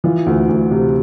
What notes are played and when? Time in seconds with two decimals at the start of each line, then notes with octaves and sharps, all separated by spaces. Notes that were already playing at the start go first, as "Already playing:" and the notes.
0.04 E3 F4
0.26 D2
0.49 D2
0.71 C3